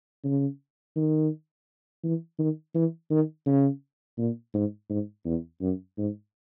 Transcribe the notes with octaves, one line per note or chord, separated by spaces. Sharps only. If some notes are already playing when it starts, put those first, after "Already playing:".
C#3
D#3
E3
D#3
E3
D#3
C#3
A#2
G#2
G#2
E2
F#2
G#2